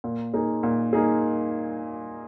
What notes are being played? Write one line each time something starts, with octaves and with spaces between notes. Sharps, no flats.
A#2
A#3 D#4 G#4
A#2
A#3 D#4 G#4